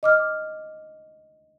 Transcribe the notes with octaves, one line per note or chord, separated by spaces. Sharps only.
D#5 D6 F6